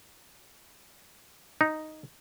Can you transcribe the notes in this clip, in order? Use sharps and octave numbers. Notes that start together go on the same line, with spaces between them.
D#4